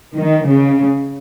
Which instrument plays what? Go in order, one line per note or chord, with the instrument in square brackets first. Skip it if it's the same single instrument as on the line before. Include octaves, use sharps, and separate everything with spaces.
[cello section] D#3
C#3